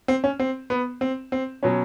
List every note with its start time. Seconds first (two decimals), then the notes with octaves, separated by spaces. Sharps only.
0.08 C4
0.24 C#4
0.39 C4
0.70 B3
1.01 C4
1.32 C4
1.63 B2 F#3 C#4